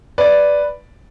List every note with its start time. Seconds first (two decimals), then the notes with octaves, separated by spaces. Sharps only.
0.18 B4 D5